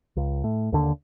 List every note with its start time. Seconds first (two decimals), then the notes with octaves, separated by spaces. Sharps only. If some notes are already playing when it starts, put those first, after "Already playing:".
0.17 C#2
0.44 A2
0.72 D#2 D3